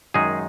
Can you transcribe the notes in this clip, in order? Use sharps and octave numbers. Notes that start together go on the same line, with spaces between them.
F#2 D#3 G#3 D#4 G#4